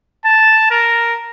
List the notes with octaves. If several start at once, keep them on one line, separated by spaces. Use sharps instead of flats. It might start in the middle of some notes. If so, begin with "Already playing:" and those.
A5
A#4